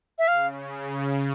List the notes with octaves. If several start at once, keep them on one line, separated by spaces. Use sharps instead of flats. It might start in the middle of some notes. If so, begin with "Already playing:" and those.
E5
C#3 F5